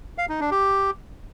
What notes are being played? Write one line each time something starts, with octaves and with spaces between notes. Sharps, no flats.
F5
D#4
D4
G4